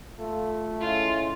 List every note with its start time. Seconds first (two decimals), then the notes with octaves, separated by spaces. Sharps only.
0.19 A3 F4
0.80 C#3 G#3 E4 F4